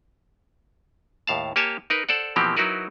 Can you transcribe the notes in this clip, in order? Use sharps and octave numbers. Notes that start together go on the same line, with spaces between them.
D#2 A2 F5 A5
A#3 G4 C#5 G#5 A5
D#4 A#4 B4
A4 C5 D5 F#5
B2 E3 F3 A#3 C4 G4
F#3 D#4 E4 F#4 A#4 B4